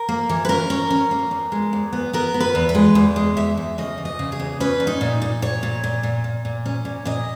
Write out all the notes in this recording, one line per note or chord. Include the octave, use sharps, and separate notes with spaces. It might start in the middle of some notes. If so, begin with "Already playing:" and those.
Already playing: A#4
A#3
E3
B4
C#4 A#4
C#4
C#4
A#3
E2
G#3
E2
B3
B3 A#4
B3
B4
E2
B4
G#3
E2
G#3
E2 E5
E2
C#3 D#5
E2
D#5
C#3
G#4
E2
C#4 B4
A#2
D#4
A#2
A#2
A#2 C#5
A#2
A#2
A#2
A#2
A#2
C#4
A#2
A#2 D#5